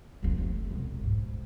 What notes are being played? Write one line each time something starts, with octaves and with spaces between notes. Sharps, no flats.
F1 F3
E3 A3
E1 C2
G#2